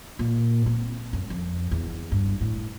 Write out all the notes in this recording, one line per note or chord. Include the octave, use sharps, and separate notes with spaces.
A#2
C4
F#2
F2
E2
G2
A2